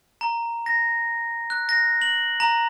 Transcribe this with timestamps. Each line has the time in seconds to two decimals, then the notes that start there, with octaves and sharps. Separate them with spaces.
0.21 A#5
0.66 A#6
1.50 F#6
1.69 A#6
2.02 F#7
2.40 A#5